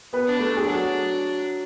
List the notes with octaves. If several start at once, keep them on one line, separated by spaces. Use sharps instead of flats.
B3 B4
D4
A3 A4
G#4
F#3 D4 F#4